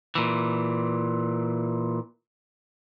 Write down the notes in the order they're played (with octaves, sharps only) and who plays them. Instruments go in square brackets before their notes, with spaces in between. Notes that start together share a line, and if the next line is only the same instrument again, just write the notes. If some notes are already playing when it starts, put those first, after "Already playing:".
[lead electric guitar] A#2 E3